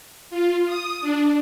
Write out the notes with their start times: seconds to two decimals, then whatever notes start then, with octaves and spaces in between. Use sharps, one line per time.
0.30 F4
0.67 D#6
1.01 D4